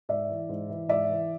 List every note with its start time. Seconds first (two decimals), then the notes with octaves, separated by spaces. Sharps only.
0.09 G#2 D5 E5
0.29 E3
0.49 G#2
0.70 E3
0.88 G#2 D5 E5
1.09 E3